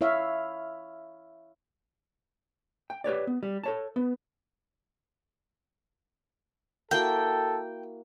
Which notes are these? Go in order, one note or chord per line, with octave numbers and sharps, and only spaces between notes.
E4 C#5 E5 F5
G5
G4 B4 C#5 D5
B3
G3
A4 C#5 A5
B3
A#3 E4 F#4 A4 G5